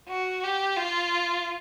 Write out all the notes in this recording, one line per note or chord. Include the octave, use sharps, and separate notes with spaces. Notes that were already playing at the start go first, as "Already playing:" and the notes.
F#4
G4
F4